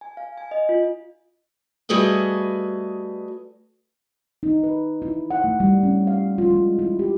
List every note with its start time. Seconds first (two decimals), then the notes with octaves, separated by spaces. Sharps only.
0.01 G#5
0.17 F5
0.38 G#5
0.51 D#5
0.69 F4
1.89 G3 A3 F#4 G#4 B4 D#5
4.43 D#4
4.63 B4
5.02 E4
5.31 F#5
5.44 A3
5.60 G3
5.83 C#4
6.07 F5
6.38 F4
6.50 G#3
6.79 E4
6.99 G4